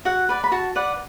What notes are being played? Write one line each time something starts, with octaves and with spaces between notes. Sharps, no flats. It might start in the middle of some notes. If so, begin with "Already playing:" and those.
F#4 F#5
B4 D5
B5
F#4 A5
B4 D5 F#5